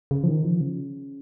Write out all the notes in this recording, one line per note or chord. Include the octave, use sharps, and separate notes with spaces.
C#3
F3
D#3
F3
C#3